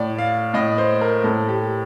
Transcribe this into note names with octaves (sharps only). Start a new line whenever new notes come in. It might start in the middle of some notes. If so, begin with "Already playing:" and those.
Already playing: A2 D5
F5
A2 D#5
C5
A#4
A2 A4
G4